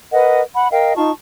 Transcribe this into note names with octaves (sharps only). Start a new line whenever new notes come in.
A#4 B4 D#5 F#5
F#5 B5
A#4 D#5 F5 G5
D#4 F4 A5 C#6